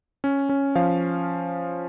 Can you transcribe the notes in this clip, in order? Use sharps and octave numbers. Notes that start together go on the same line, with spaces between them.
C#4
C#4
F3 F5